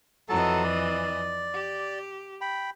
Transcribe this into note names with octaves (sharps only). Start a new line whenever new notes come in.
F2 E3 F#3 A4 D#5 A5
D5
G4
G5 B5